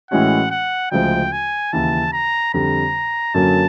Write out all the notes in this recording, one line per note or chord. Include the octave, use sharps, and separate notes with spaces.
A2 E3 G#3 C#4 F#4 F#5
F#5
D2 C#3 F3 G#3 G5
G#5
D#2 C#3 E3 A5
A#5
F2 D3 G3 A#5
F#2 D3 F#3 A#3 C#4 A5